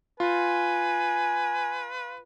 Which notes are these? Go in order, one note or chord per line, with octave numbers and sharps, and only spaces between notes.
F4 B4 G#5